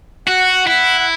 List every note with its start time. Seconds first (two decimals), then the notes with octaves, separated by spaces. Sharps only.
0.28 F#4 F#5
0.67 E4 F#5
0.99 F#5